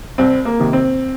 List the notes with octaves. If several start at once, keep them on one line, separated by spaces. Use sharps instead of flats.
C2 C4
A#3
C3 D#3
C4